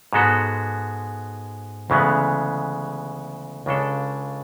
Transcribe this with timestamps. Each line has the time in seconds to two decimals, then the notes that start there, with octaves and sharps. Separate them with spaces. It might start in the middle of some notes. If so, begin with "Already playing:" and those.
0.13 G#2 G#3 B3 F#4 A4
1.90 D2 C#3 E3 G#3 B3
3.66 C#2 C#3 G#3 D4 A4